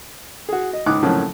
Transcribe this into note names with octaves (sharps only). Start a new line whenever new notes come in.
F#4 G#4
D#5
C#2 G#2 D6 D#6 F#6
F2 A2 C#3 F3 F#3 A#3